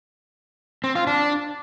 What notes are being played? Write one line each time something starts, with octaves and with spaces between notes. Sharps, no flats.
C4
F4
D4